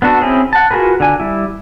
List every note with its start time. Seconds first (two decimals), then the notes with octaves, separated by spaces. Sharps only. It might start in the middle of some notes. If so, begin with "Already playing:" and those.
0.02 B3 D4 F#4 A4
0.22 C4 C#4 E4 G#4
0.53 F#5 A5
0.71 F4 F#4 G#4 A#4 B4
1.00 D3 G#5
1.20 G3 E4